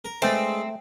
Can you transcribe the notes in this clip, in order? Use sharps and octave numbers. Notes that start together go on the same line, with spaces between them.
A#4
G#3 A3 C4 D4 B4